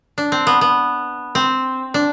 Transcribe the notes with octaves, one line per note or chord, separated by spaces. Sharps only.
D4
C4
B3
B3
C4
D4